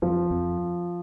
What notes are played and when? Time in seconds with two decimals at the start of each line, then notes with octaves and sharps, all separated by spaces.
0.02 F2 F3
0.31 F2